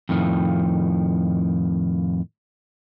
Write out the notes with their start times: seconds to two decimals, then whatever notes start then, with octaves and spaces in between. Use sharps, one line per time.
0.09 F2 A2 D#3 F3